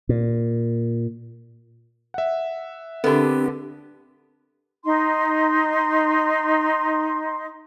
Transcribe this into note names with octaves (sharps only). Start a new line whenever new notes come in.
A#2
E5 F#5
D3 B3 C4 D4 G4 A4 A#4 A5
D#4 C6